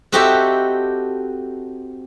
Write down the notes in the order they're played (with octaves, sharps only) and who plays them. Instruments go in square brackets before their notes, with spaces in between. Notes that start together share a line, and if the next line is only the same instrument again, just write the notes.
[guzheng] C4 D#4 F#4 G4 A4 E5